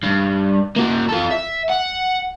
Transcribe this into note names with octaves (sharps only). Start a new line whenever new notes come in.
G2
A#3 F#4
F4 A4
E5
F#5